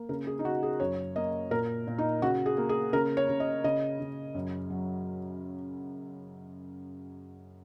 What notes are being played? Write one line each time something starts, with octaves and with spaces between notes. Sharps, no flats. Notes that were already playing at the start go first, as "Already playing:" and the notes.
Already playing: A#3
C#3 A#4
G#4
D#4
C#3 F#4
G#4
F#2 C#5
A#3 D#5
A#2 A#4
A#2
D#4
C#3 F#4
G#4
A#3
G#4
C#3 A#4
C#5
C#3
D#5
C#3 D#5
C#3
F#2
F#3